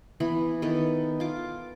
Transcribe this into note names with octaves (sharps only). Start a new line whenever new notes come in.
E3 B3 B5
D#3 B3 A4 B4
F4 D6